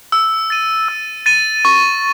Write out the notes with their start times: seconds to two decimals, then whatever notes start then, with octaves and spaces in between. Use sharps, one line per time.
0.12 E6
0.50 A6 D#7
0.88 E6
1.26 A6 D#7
1.65 C#6